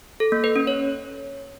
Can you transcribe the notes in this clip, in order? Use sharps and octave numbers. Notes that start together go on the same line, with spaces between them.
A4
A#3
B4
C#4
C#5